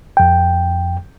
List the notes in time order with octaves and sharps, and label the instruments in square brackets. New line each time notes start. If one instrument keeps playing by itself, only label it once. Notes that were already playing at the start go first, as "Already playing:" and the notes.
[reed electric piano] F2 G5